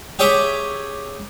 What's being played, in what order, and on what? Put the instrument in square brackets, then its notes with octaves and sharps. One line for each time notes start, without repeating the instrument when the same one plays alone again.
[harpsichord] G4 G#4 C#5 E5 G5 D6